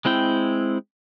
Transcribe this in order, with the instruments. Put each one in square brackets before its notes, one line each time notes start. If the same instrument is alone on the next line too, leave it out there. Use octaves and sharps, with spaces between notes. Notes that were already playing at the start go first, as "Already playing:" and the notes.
[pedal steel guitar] G#3 C4 E4 G5